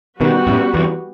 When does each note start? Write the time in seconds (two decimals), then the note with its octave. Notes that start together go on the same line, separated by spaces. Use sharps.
0.21 B2 D#3 G3 B3 F#4 B4
0.47 F#2 A2
0.74 E2 G2